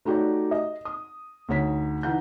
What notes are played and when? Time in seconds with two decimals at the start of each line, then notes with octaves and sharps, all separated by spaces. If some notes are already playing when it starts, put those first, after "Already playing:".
0.05 A3 D#4 F#4 G4 C#5 D5
0.51 D#5
0.85 D#6
1.49 D2 D#4 C#5 B6
2.03 E3 D#4 F#5 G6